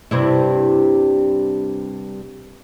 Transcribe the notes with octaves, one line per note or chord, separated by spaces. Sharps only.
G2 C3 E4